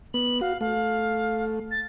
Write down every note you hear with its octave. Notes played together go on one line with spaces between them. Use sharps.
B3 F#7
F#4 F5
A3 F5
A6